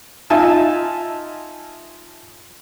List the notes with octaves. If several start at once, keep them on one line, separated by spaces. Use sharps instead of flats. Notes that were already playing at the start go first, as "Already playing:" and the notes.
D#4 F4 E5 G#5 A5